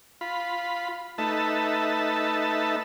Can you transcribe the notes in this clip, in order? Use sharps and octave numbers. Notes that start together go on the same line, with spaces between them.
F4 B5
A3 D#4 B4 E5 A5